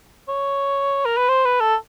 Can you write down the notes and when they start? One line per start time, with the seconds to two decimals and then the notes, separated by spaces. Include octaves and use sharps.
0.29 C#5
1.06 A#4
1.18 B4
1.29 C5
1.45 B4
1.61 A4